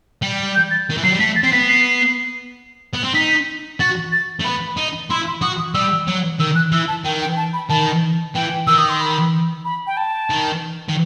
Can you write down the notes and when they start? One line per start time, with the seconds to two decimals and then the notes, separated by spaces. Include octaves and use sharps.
0.22 G3
0.55 G6
0.71 A6
0.90 D#3
0.97 E3
1.04 F#3 C7
1.12 G3
1.19 A3 B6
1.36 A6
1.43 C4 C7
1.52 B3 B6
1.68 C7
2.94 B3
3.04 C4
3.14 D#4 B6
3.80 F#4 A6
4.12 A6
4.41 A3
4.44 B3 B5
4.77 D#4
5.10 E4 C6
5.27 C6
5.42 F#4 D#6
5.59 D#6
5.74 G3 E6
6.08 F#3
6.40 D#3 E6
6.55 F#6
6.72 E3 E6
6.88 A5
7.04 D#3 G5
7.21 G5
7.37 A5
7.53 B5
7.69 D#3 A5
8.35 E3 G5
8.67 D#3 E6
8.78 D#6
8.89 C6
9.00 B5
9.65 B5
9.87 G5
9.97 A5
10.30 D#3
10.89 D#3